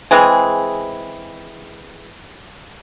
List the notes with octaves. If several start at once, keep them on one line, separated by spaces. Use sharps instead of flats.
E3 G#3 C4 G#4